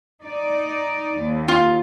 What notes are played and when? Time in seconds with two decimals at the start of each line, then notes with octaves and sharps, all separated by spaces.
0.24 D#4 D5
1.18 D#2
1.48 F4